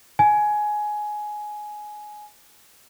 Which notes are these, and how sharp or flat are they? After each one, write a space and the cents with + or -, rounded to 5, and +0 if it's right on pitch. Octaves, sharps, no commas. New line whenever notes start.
G#5 +15